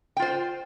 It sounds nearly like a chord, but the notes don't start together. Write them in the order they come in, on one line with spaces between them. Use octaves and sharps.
G5 F4 C5